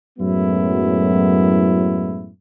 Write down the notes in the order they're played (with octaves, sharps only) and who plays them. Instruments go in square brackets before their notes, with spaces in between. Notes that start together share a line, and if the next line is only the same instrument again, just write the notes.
[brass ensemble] F#2 A2 F#3 G#3 B3 E4